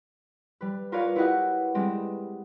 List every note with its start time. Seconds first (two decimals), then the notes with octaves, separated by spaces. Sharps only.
0.61 G3 B4
0.92 F4 A#4 B4 C#5 D5 F5
1.16 E4 F#4 G4 B4 D#5 F#5
1.75 G3 G#3 C4